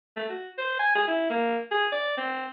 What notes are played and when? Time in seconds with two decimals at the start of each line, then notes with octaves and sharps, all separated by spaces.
0.16 A3
0.29 F#4
0.58 C5
0.79 G#5
0.95 G#4
1.07 E4
1.30 A#3
1.71 G#4
1.92 D5
2.17 C4